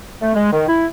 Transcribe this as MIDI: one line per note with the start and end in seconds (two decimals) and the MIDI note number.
0.20 0.34 57
0.34 0.48 56
0.52 0.67 51
0.68 0.86 64